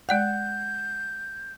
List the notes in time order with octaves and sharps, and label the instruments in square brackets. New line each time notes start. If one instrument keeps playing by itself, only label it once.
[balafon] G#3 D5 G5 [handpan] F#5 [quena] G6